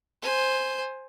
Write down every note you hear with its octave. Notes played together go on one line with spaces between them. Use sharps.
C5 G#5